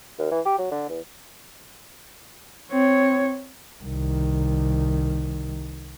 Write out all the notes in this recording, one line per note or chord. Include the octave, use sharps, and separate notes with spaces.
D#2
E3
G4
F#3
D3
E2
C4 C#5
C2 D#3